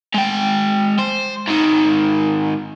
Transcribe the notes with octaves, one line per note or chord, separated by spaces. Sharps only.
G#3 G5
C5
G#2 D#3